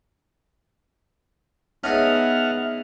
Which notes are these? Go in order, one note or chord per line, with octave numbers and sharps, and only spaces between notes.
B3 C#4 D#4 G#4 E5 F#5 A5 F6